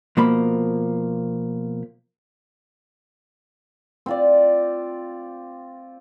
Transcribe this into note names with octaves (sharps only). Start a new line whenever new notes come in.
B2 F3 A#3 B5
C4 F4 D5